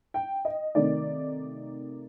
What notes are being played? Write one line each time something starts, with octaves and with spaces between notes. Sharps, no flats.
G5
D#5
C3 D#3 A3 D#4 D5